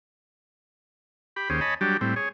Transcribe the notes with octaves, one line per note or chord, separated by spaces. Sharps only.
G4 B5
D#2 C#4 G4 G#4 C5
C#5 D#5 G#5 A5 B5
F#3 G3 D4 G4
A2 G3 C4
G#4 C#5